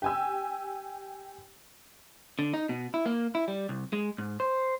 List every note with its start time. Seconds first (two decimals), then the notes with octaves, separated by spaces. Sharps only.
0.02 G4 G#5 E6
2.39 D3
2.54 D#4
2.69 B2
2.94 E4
3.06 A#3
3.35 E4
3.48 G3
3.69 C2
3.93 G#3
4.18 G#2
4.40 C5